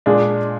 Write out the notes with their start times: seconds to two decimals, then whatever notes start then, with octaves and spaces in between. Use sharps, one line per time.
0.06 A#2 G#3 D4 G#4